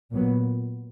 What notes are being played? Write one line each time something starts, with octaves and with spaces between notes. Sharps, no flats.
A#2 F#3 B3